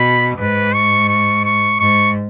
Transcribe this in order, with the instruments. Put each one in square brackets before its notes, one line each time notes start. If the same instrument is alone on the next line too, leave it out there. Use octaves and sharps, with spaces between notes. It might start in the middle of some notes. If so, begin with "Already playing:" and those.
Already playing: [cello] B2 [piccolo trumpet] B5
[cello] G#2 [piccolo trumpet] B4
[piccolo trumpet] C#6
C#6
C#6
[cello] G#2 [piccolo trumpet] C#6